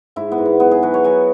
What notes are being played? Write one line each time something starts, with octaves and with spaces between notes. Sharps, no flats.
G#2 E4
B3
G#2
B3
F#3 B3
G#4
F#3 B4
C#5
F#3 G#5